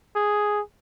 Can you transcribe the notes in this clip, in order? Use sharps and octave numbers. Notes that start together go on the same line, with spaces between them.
G#4